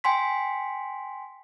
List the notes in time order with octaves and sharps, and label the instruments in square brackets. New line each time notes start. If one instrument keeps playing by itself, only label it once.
[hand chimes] G5 G#5 C6 B6